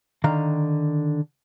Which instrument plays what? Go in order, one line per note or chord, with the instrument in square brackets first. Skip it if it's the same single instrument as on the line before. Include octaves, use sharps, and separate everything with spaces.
[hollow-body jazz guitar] D3 D#3 F5 A#5